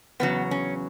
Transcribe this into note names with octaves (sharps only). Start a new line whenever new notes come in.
E2 C#3 F#3 B3
C#4